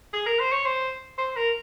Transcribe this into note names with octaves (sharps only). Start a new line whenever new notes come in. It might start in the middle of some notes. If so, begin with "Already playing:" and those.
G#4
A#4
C5
C#5
C5
C5
A#4